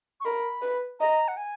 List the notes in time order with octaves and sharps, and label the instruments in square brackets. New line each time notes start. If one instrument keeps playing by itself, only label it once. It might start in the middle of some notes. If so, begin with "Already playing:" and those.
[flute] C#6
[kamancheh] A#4 [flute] B5
[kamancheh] B4
[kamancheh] D#5 [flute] A#5
[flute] F#5
G#5